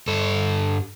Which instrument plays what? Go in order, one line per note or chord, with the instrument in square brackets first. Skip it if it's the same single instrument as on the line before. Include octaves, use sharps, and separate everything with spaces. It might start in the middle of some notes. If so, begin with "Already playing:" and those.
[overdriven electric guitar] G2 A4